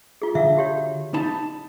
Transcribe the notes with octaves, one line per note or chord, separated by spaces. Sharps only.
F4 G#4
D3 E5 F5
F#4 G4 C#5
D#4 A5 B5